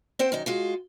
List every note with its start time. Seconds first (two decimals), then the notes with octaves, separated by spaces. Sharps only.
0.19 C4 C5 F#5 G5
0.32 F#2 D#3 D#4
0.46 G#3 F4 F#4